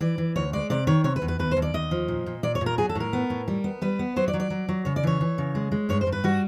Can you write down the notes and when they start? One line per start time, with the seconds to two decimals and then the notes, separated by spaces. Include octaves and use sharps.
0.01 E3 D5
0.18 E3
0.36 D2 C#5
0.53 G#3 D5
0.70 C3 D5
0.87 D#3 C#5
1.04 C3 C#5
1.16 B4
1.22 E2
1.28 B4
1.39 D#2 B4
1.51 C5
1.57 D#2
1.62 D5
1.74 D#2 D#5
1.91 F3
2.08 A#2
2.26 A#2
2.43 A#2 D5
2.55 C#5
2.61 A#2
2.66 A#4
2.78 F#3 G#4
2.89 A4
2.95 A2 A#4
3.13 B3
3.30 A2
3.48 G3
3.64 B3
3.82 G3 B4
3.99 B3
4.16 F#3 C5
4.28 D5
4.34 F#3
4.40 D5
4.50 F#3
4.69 F#3
4.85 C#3 C#5
4.96 D5
5.03 E3 C#5
5.21 E3
5.38 C#3
5.55 G#3
5.72 G#3
5.89 G2 C#5
6.01 C5
6.07 G2
6.12 B4
6.24 G3 F#4